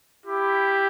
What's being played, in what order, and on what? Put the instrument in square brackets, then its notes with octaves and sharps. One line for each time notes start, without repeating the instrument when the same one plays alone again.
[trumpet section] E4 G4